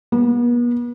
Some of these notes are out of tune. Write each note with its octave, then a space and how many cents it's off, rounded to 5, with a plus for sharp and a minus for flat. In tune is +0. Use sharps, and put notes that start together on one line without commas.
B3 -40